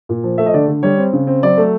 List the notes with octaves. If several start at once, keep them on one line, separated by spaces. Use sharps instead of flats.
A#2
F3
A3 E5
D#5
D3 D5
D3
G3 C#5
C4
C#3
C4
F#3 D5
A3